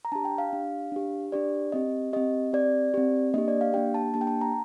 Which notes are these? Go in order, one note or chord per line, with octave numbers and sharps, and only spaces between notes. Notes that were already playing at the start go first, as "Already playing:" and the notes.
A#5
D4 G4 A5
G5
F5
D4 G4
D4 G4
D4 G4 D5
C4 G4 D#5
C4 G4 D#5
C4 G4 D5
C4 G4
A#3 D4 G4 D#5
D5
F5
A#3 D4 G4 G5
A5
A#3 D4 G4 A5
G5
A5
A#5